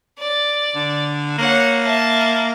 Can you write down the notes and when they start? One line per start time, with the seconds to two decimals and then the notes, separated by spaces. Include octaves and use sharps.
0.18 D5
0.75 D3
1.38 A#3 C#5 F#5
1.82 E5 A5